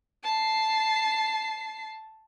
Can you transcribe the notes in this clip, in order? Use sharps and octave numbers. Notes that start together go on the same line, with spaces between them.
A5 C7